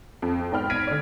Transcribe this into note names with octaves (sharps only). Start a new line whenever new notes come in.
F2
G#2 B3 D5 G5 B5 F6
F6 G#6 A#6 B6 D7 D#7
D3 D5